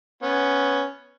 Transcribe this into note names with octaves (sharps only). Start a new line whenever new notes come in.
B3 C#4